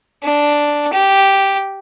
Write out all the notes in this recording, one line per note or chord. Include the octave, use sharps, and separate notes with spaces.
D4
G4